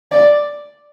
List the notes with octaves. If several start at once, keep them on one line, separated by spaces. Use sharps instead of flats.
D5